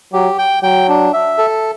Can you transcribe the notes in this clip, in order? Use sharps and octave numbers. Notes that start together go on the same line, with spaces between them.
F#3 G4
G5
F#3 G5
D4
E5
A4